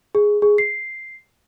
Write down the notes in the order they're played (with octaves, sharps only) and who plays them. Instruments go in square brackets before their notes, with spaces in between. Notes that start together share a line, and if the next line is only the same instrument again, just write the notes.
[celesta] G#4
G#4
C7